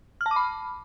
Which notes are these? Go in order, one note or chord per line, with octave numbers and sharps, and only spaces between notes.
F6
A5
D6
B5